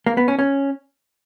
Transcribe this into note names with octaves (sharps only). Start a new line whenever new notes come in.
A#3
B3
C#4
C#4